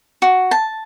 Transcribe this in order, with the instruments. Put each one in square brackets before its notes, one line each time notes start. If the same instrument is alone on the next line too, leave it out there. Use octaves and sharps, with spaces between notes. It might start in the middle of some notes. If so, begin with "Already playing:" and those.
[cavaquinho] F#4
A5